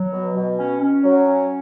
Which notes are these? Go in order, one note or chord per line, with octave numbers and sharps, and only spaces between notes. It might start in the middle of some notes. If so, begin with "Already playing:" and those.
Already playing: F#3
B2
B2
C#4
C#4
F#3
C#4